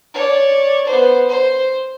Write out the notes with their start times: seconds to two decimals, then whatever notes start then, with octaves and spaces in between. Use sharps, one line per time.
0.14 C#5 D5
0.87 B3 C5
1.29 C5